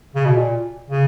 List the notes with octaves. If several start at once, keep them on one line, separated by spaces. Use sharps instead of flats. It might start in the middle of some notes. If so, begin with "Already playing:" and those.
C#3
B2
A#2
C#3